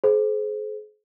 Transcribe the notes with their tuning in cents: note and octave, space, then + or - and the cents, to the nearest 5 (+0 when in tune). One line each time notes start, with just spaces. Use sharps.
G#4 +40 C5 +0